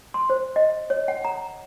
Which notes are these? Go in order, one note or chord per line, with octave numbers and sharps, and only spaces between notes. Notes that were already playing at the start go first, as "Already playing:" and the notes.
C6
C5
D#5
C#5
F#5
A#5